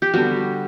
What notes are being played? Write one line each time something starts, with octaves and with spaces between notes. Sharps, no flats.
G4
D3 G3 B3 F#4